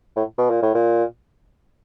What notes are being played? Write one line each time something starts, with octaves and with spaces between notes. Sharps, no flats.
A2
B2
A#2
A2
A#2